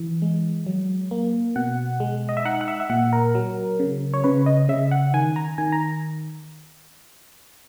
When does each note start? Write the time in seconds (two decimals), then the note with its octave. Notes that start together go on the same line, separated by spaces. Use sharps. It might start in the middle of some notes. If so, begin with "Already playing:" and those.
Already playing: E3
0.22 G#3
0.67 F#3
1.11 A#3
1.55 B2 F#5
2.00 G#3
2.29 D#5
2.37 E5
2.45 D#4 F#5
2.61 F#5
2.68 E5
2.80 E5
2.90 A#2 F#5
3.13 A#4
3.35 F#3
3.79 C#3
4.14 C#5
4.24 C#3 B4
4.46 D#5
4.69 C#3 E5
4.91 F#5
5.14 D#3 G#5
5.36 A#5
5.58 D#3 G#5
5.72 A#5